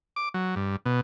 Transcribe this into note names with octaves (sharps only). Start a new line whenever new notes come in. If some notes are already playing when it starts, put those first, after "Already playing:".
D6
F#3
G2
B2